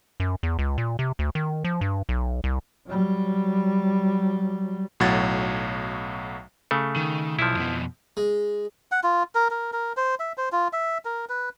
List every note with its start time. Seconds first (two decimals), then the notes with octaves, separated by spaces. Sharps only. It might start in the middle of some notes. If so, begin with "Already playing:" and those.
0.20 F#2
0.43 E2
0.59 C#2
0.78 A#2
0.99 C3
1.19 D2
1.35 D#3
1.64 F3
1.81 G2
2.09 B1
2.44 C2
2.87 F#3 G3
5.00 B1 A2 F#3 F#5 G#6 A6
6.71 C#3 A3
6.96 D#3
7.39 B1 F3 E4
7.57 F2 B2
8.17 G#3
8.92 F#5
9.03 F4
9.35 A#4
9.50 A#4
9.73 A#4
9.97 C5
10.20 E5
10.38 C5
10.52 F4
10.73 E5
11.05 A#4
11.29 B4